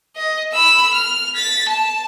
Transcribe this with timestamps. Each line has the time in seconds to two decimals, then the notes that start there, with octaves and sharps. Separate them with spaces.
0.16 D#5
0.52 B5 E6
0.93 F6
1.35 A6 B6
1.68 A5